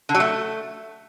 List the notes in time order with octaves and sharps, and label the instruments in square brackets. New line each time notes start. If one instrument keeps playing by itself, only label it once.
[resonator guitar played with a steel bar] D3
F#3
A3